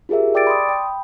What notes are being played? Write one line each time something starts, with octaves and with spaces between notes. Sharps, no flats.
F4 G4 G#4 A#4 E5
D5 G5 D6 E6 A6 D7
B5 C6 D#6
G5 B5